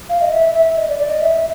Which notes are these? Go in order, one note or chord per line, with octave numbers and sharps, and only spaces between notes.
F5
D#5
E5
E5
D#5
D5
D5
D#5
E5